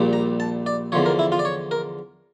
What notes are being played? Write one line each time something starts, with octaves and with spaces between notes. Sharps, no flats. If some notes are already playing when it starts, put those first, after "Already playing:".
Already playing: A#1 A#2 G3
A#5
A5
D5
E2 D3 F3 C#5
A#4
E4
F4
D5
C#5
A#4